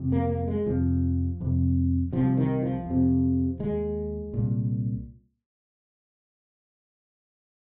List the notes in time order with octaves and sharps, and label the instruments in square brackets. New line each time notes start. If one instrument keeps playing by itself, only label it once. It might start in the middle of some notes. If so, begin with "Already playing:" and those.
Already playing: [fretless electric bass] F2 C3
A#3
A#3
G#3
F2 C3 F3
F2 C3
C2 C3 F3
D#3
F3
F2 C3
D#2 G#3
C2 A#2